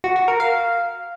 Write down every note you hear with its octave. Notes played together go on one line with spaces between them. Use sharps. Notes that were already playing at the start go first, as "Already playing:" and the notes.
F#4
F#4
A#4
F5